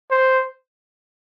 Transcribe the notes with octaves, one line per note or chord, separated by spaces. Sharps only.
C5